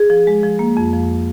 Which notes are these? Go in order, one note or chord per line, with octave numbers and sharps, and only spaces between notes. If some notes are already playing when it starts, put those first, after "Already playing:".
Already playing: G#4
F3
G#3
F3
A#3
F2
F3